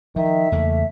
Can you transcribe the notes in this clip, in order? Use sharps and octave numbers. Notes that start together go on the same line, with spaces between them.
D#3 F3 E5
E2 C#3 A3 A#3